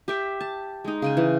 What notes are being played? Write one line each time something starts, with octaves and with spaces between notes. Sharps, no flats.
G4 E5 G5
A5
G#3 D#4
C#3 G5 G#5
E3